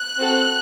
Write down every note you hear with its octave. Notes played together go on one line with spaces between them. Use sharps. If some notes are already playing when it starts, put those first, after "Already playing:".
Already playing: F#6
C4 F#4 A4